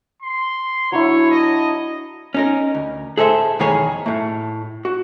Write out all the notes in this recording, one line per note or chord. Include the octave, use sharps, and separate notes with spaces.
C6
F#3 D4 E4 C#5
D#5 A5
C#4 D#4 A#4
D2
G#4 A4 C5 D#5 E5
B1 E2 D#3 G#4 C#5 B5
A2 A3
F#4